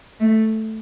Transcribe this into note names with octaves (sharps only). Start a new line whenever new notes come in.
A3